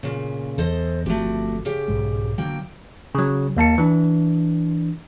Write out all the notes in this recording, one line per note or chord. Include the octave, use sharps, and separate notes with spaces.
A#2 C#3
E2 A4 C5 D#5
G1 F3 A3 C4 F#4 G4
C#3 G4
B1 G#2 G#3
D3 F#3 A#3 G5
C#3 F#3
D#2 A#3 A5 C#7
E3 D4